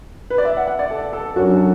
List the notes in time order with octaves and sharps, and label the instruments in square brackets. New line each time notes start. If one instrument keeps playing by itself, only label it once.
[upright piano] B4
D5
E5
F#5
F#5
D5
A4
A4
[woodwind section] F#2 F#3 D4 [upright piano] F#4
[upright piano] A4